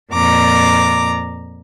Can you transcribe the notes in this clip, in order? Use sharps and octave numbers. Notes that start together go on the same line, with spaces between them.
F2 A#2 A#5 D6